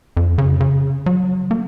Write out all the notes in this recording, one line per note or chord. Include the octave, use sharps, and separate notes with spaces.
F2
C#3
C#3
F#3
A#3